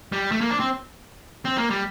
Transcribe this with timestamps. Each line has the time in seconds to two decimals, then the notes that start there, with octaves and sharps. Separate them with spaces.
0.12 G3
0.32 A3
0.41 A#3
0.50 D4
0.60 C4
1.45 C4
1.58 A#3
1.70 G3